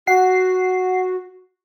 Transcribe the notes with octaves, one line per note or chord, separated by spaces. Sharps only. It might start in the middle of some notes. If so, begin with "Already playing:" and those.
F#4 F#5 C7